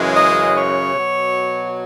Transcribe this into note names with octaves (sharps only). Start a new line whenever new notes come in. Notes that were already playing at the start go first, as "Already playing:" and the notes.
Already playing: F#2 C#3 E3 G#3
D#5
C#5
B2 F#3